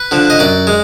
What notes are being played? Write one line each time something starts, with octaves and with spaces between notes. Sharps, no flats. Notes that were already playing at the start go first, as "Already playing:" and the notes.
Already playing: B4
D3 F3
D#5
F#2 D5
G#3